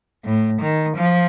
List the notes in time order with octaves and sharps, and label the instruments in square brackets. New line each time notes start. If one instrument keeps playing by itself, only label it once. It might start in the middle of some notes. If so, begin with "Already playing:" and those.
[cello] A2
D#3
F3